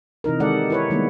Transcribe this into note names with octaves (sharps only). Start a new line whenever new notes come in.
C3 E3 D#4 A#4
D#3 G#3 A4 D5 F#5
E4 B4 C#5
D#3 G3 G#3 A#3 B3